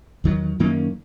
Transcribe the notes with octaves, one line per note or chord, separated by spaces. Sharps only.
E2 D#3 F#3
F#2 D#3 A#3 C#4